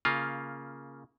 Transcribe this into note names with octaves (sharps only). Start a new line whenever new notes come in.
C#3 A#3 F4